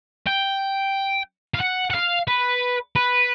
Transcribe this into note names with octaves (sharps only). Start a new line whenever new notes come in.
G5
F5
F#5
F#5
F5
B4
B4